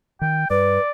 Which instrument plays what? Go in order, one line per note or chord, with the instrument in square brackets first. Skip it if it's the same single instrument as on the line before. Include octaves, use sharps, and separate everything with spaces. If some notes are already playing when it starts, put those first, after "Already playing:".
[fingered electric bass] D#3 [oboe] G5
[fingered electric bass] G2 [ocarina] B4 [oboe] D5